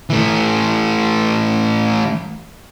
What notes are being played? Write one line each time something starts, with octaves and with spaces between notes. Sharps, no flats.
E3 A3